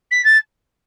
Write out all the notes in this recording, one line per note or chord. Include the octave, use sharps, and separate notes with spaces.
B6
A6